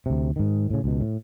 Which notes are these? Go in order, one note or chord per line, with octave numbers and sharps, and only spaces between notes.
D2 C3
G#2 D#3
A2 C#3
C#2 B2
A2